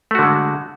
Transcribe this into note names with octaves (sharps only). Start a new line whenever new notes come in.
D3 G#3 A3 F#4